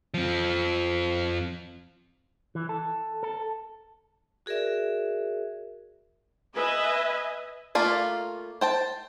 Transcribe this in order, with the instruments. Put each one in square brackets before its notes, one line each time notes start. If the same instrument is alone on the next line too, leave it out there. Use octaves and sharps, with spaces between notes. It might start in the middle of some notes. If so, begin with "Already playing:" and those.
[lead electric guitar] F2 F3
[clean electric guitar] E3
A4
A4
[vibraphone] F#4 G#4 A#4 D5 E5
[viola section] B4 D#5 E5 G#5
[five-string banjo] A3 A#3 F4 D5
C5 G5 A5